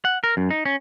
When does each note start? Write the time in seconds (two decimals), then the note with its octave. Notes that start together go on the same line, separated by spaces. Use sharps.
0.05 F#5
0.24 A#4
0.37 F#2
0.51 D#4
0.66 C#4